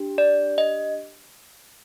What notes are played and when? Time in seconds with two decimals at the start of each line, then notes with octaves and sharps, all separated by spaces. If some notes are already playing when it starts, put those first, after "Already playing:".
Already playing: D4 G4
0.18 D5
0.58 D#5